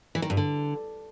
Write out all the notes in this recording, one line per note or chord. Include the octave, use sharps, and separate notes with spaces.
E3
D#3
G2
D3